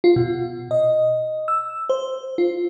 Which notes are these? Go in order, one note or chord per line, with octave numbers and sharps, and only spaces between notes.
F4
B2
D#5
E6
C5
F4